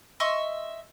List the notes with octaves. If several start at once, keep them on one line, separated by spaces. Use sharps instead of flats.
D#5 E5 C6 C#6